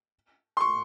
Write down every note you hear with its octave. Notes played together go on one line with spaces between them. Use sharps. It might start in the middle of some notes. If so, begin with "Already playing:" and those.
C6
C#6